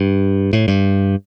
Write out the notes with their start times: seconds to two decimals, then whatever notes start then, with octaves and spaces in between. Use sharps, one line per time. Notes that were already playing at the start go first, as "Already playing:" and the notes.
Already playing: G2
0.53 A2
0.68 G2